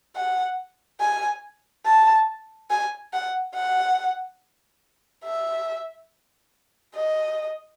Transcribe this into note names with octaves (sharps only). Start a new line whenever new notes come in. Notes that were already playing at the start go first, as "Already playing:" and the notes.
F#5
G#5
A5
G#5
F#5
F#5
E5
D#5